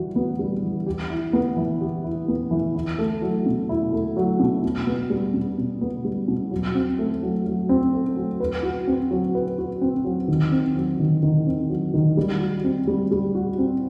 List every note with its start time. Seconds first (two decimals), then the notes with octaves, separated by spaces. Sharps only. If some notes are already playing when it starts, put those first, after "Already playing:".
Already playing: E3 G3 F#4
0.16 B3
0.39 G3
0.63 E3
0.86 G4
1.10 E4
1.33 B3
1.57 E3
1.81 G4
2.04 E4
2.28 B3
2.51 E3
2.75 E4
2.99 A3
3.22 F#3
3.46 B2
3.69 E4
3.93 A3
4.17 F#3
4.40 B2
4.63 B2
4.87 B3
5.10 G3
5.34 B2
5.58 B2
5.81 B3
6.05 G3
6.28 B2
6.51 F#3
6.75 C4
6.99 A3
7.22 F#3
7.46 F#3
7.69 C4
7.94 A3
8.16 F#3
8.40 B4
8.63 F#4
8.87 C4
9.11 F#3
9.35 B4
9.58 F#4
9.82 C4
10.04 F#3
10.28 D#3
10.52 C4
10.76 F#3
10.99 D#3
11.23 D#3
11.46 C4
11.70 F#3
11.94 D#3
12.17 G3
12.40 F#4
12.64 C4
12.87 G3
13.11 G3
13.35 F#4
13.58 C4